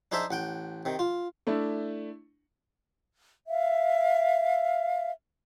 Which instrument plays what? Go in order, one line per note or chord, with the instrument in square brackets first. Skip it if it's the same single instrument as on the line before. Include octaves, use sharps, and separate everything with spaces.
[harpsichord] D4 D#4 G#4 C5 E5 A5
A1 F#5 G5
C3 D#3
F4
[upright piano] A3 D4 E4
[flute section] E5 F5